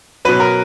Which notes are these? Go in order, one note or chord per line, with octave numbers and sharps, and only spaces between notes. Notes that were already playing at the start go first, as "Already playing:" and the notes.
B2 F#3 B4
A#4